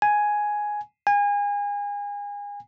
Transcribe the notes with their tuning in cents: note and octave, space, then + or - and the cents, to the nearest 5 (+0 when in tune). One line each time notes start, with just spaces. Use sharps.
G#5 +5
G#5 -30